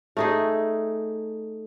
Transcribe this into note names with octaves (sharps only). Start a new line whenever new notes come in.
A3 D#4 G#4